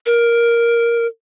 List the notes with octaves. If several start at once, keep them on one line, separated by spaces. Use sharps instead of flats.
A#4